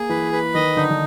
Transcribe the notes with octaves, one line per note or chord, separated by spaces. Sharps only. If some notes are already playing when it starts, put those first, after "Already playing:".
Already playing: A#3 G#4
E3 B4
B4
D#3 D#5
D3 D#4
D3